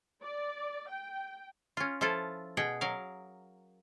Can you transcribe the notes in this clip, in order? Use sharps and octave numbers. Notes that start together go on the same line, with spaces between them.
D5
G5
C#4 F4
F3 E4 F4 A4
B2 G#4 F#5 G5
F#3 A#4 F5